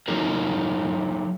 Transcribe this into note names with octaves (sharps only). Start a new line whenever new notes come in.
F#3 D#4 G#4 A#4